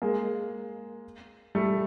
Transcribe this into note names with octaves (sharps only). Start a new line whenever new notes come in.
G#3 A#3
G3 A3